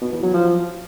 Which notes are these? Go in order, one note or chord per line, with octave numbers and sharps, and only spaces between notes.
B2
E2
F#3
F3